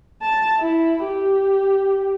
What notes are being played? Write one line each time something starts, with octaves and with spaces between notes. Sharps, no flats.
A5
E4
G4